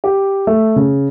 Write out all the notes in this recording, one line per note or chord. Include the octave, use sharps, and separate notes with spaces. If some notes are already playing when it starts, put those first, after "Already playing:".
G4
A3
C#3